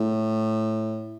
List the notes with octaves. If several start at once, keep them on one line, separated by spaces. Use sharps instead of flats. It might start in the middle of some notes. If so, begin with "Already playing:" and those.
Already playing: A2